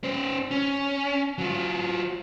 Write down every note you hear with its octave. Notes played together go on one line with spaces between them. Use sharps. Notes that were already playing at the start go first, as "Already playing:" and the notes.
C#4 C5
C#4
F#3 F4